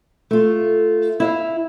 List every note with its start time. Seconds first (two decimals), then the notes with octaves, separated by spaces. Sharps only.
0.31 A3 F4
1.20 E4 E5 F5